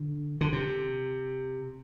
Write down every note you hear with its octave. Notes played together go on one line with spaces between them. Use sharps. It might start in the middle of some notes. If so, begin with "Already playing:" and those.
Already playing: D3
D3
C3